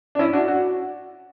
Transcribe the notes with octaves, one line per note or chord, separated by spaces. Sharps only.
D4
C#4 E4
D4 F#4
F#4